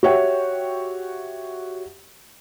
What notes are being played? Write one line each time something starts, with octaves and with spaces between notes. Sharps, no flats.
F#4 G4 C#5 E5 F#5 G5